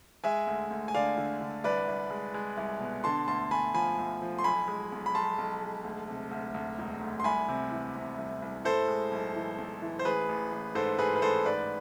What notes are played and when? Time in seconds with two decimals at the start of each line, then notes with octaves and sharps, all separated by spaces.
0.24 G#3 E5 G#5
0.47 D2
0.71 D2
0.88 G#5
0.95 D3 D5 F5
1.18 D3
1.41 D3
1.64 C2 B4 D5
1.88 C2
2.10 G#3
2.34 G#3
2.57 C2
2.80 B2
3.04 D3 A5 C6
3.28 D2 A5 C6
3.51 D2 G#5 B5
3.74 F3 G#5 B5
3.98 D2
4.22 F3
4.39 C6
4.44 B1 G#5 B5
4.68 G#3
4.92 B1
5.06 B5
5.14 B1 A5 C6
5.38 B1
5.61 G#3
5.84 D2
6.08 C3
6.31 D2
6.54 D2
6.78 E1
7.01 D2
7.20 C6
7.24 C2 G#5 B5
7.48 C3
7.71 E3
7.96 C3
8.18 C2
8.42 C2
8.64 A2 A4 C5
8.88 G#3
9.11 B1
9.35 E3
9.58 B1
9.82 E3
9.99 C5
10.05 A1 G#4 B4
10.29 A1
10.52 A1
10.75 G#2 A4 C5
10.98 G#2 G#4 B4
11.16 B4
11.22 A1 A4 C5
11.45 G#2 B4 D5